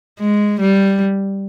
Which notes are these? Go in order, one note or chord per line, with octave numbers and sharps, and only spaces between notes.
G#3
G3